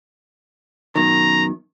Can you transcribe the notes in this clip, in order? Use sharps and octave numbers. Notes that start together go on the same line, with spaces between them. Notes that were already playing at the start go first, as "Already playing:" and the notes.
F#2 B2 D#3 A#5